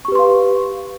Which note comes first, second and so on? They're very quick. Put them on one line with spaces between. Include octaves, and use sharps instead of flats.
C#6 G4 B4 C6 F5